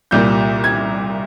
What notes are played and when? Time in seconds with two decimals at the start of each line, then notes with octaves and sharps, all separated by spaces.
0.11 C2 A#2 G3 G6
0.64 G#6